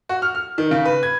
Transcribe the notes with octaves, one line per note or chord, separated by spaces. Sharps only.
F#4
F6
F6
D#3
C#3
B4
G#6